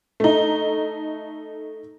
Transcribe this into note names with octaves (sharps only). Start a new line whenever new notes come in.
A3 D#4